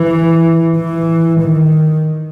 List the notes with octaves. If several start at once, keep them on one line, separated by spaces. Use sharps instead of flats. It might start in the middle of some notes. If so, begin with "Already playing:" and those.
Already playing: E3
E3
D#3